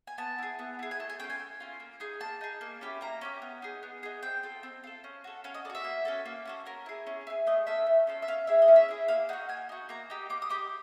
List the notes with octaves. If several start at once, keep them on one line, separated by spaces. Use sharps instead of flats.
G#5
B3 A5
E4 G#4
B3
E4 G#4
G#5
A3 A5
G#5
C#4 F4 G5
G#5
A3
C#4 F4
A#3
D#4 G#4
A#3 A5
D#4 G#4
A#3
C#4 E4 G4
A#3 A#5
C#4 E4 G4
B3
D#4 G#4
B3
D#4 G#4
C4 G5
F4 A4
C4
F4 A4
C#4
F#4 A4
C#4 F5
D#5
A4 D5
F#4
E5
A#3
C#4 F#4 A4
A#3
C#4 F#4 A4
C#4 A#4
E4 G#4
C#4
E4 G#4
A3 D#5
C#4 F4 A4 E5
A3
C#4 F4 A4
E5
C#4 F5
E4 G#4 E5
D#5
C#4
E5
E4 G#4
A#3 F5
D#4 F#4 F#5
A#3 G#5
D#4 F#4
A#3 A#5
D#4 G4
A#3 D6
D#6
D#4 G4 D6